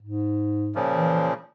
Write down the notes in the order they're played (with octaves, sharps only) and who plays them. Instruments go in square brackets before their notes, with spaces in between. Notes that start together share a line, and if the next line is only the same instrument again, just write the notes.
[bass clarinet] G#2
[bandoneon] A#2 C#3 F3
[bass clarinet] E3